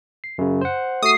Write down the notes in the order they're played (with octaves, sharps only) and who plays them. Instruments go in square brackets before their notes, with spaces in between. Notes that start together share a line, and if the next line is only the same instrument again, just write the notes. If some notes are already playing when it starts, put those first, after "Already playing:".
[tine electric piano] C7
F#2 C#3
C5 F#5
[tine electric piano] A3 F#4 [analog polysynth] D#6 C7